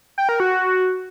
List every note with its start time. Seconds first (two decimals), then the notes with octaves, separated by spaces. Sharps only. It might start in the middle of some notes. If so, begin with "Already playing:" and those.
0.18 G5
0.29 A#4
0.40 F#4